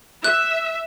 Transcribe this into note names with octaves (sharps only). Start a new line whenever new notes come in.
E5 F#6